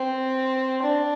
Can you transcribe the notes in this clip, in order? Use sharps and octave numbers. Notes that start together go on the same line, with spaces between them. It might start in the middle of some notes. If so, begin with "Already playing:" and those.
Already playing: C4
D4